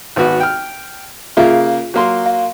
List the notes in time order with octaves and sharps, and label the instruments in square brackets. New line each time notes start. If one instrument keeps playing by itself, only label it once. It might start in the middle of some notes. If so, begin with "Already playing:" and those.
[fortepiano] G#1 B3 F#4
G5 F6
[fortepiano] C#3 A#3 [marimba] F4 G#4 E5
[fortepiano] F#3 A#3 C6
[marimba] F5